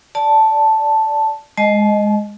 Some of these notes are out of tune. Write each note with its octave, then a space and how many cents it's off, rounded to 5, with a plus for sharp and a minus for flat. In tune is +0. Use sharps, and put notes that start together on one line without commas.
D5 -15 A5 +0
G#3 +0 D#5 +0 A5 -45